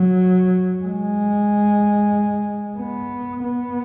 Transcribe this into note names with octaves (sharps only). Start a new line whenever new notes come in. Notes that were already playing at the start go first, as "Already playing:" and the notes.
Already playing: F#3
G#3
B3
B3